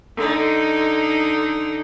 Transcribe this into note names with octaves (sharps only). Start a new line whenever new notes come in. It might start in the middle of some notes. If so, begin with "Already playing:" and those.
D3 D#4